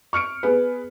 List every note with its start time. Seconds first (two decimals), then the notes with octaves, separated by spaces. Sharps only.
0.13 C#6 F6 C#7 D7
0.43 B3 G#4 B4